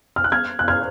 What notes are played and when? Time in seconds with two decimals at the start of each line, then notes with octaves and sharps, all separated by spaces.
0.16 F6
0.24 F#6
0.32 F6 G#6
0.59 F#6
0.68 F6 G#6